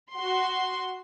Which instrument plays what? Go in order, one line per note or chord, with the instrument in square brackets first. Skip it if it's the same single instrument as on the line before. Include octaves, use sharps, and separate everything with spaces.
[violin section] F#4 C6